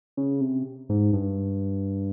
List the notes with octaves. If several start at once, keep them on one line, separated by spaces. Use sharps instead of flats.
C#3
C3
G#2
G2